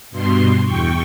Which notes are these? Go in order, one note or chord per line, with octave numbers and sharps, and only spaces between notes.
G2 B2 C6
E2 G5 C#6